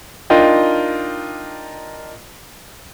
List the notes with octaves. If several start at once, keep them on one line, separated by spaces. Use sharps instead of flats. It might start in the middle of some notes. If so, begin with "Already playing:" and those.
D4 D#4 F4 A#4 D#5 G5